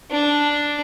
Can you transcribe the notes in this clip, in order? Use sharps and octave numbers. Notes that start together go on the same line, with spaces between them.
D4